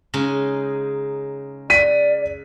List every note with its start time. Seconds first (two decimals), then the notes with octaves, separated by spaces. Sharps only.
0.14 C#3 G#3 D#4
1.70 D5 B6 D#7